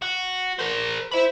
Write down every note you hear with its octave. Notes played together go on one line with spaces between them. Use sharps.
F#4
A#4 C5
C5 E5 B5